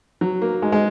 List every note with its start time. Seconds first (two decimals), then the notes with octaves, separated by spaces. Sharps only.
0.21 F#3
0.42 A#3
0.62 G#3
0.72 G#3